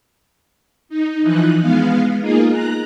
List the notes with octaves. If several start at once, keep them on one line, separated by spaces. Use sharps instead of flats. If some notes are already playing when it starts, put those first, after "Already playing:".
D#4
E3 F3 D#4 F#6
G#3 B3 F5
A#3 D#4 F4 G#4
A#5 F#6